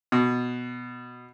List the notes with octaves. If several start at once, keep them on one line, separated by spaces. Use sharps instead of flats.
B2